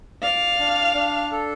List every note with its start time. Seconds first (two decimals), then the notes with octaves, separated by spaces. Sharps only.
0.23 D5 F5
0.59 D4
0.95 D4
1.32 A4